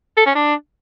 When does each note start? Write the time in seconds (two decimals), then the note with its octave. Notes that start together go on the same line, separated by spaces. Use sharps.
0.17 A4
0.26 C#4
0.35 D4